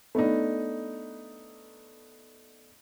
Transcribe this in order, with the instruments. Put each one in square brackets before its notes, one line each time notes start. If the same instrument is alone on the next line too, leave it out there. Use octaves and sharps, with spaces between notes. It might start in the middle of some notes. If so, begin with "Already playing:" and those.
[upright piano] A3 B3 D4 D#4